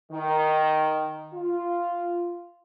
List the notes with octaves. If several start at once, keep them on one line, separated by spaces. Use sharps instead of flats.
D#3
F4